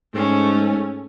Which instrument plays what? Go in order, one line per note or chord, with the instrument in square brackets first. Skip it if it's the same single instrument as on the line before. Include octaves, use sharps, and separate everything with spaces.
[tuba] G#2 [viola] A3 C#4